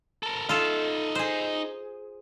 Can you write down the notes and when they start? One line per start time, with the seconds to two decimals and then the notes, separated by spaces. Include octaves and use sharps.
0.23 A4 A#4
0.49 D#4 F4 A4 E5
1.15 G#4 C5